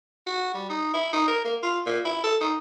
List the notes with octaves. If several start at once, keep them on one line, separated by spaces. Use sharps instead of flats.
F#4
G3
D#4
E4
D#4
A#4
A#3
F4
A#2
E4
A4
D#4